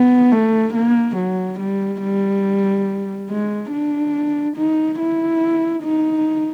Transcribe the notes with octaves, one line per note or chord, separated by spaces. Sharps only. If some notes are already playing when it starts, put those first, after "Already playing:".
Already playing: B3
A3
A#3
F#3
G3
G3
G#3
D4
D#4
E4
D#4